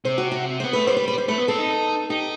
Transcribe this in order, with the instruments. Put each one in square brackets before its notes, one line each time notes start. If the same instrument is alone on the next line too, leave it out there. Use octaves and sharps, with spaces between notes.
[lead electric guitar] C3 [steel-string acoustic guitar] C5
[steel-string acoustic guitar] F#4
F#4
[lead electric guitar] B3 [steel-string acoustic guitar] C5
[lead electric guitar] A3 [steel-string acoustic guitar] B4
[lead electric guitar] G3 [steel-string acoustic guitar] C5
[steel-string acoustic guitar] B4
B4
C5
[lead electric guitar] A3 [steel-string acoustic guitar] B4
[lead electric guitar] B3
[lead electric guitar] C4 [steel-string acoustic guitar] A4
[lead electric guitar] D#4
[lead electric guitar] D#4 [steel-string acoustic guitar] G4